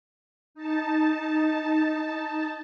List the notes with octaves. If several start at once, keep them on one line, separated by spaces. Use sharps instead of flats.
D#4 A5